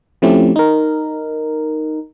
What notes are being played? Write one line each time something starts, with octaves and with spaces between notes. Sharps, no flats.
F3 A3 C4 C#4 E4 G4
D#4 A#4